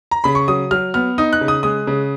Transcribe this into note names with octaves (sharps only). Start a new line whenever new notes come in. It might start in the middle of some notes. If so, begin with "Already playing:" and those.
A#5
C#3 B5
C#6
F#3 D#6
F#3 F6
B3 F6
D#4 D#6
F#6
C#3
D#6
G#3 D#6
C#3